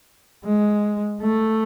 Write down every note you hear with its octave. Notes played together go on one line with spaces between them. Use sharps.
G#3
A3